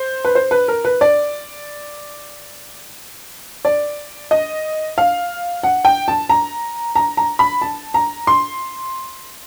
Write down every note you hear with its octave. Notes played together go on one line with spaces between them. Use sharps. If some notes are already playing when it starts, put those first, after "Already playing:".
Already playing: C5
B4
C5
B4
A#4
B4
D5
D5
D#5
F5
F#5
G5
A5
A#5
A#5
A#5
B5
A5
A#5
C6